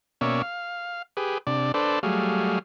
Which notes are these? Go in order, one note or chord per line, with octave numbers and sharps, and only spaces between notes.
B2 A#3 C#4 C#5 D5 E5
F5
G4 G#4 B4
C3 D4 D5
D4 A4 B4 C5 D5
F#3 G3 A3 G#4 F5